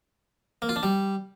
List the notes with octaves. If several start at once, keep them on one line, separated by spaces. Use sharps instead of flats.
A#3
F4
D4
G3